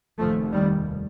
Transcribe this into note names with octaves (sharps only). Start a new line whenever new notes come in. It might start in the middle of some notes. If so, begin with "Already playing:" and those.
F1 D#2 F3 A3
D#3 G3